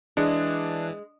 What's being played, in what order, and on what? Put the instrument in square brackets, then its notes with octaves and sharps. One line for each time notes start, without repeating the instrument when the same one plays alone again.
[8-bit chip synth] E3 [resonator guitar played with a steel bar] G#3 [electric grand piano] D4